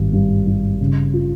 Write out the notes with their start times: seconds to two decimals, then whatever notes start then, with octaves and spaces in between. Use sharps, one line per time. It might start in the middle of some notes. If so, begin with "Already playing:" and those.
Already playing: G#1 G2
0.13 G2
0.47 G2
0.80 C#3
1.14 F4